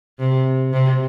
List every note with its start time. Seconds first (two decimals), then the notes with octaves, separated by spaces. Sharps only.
0.19 C3
0.73 C3